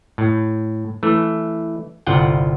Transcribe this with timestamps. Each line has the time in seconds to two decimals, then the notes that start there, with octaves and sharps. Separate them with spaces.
0.18 A2
1.03 E3 A3
2.07 G1 C2 F4 F#5 G5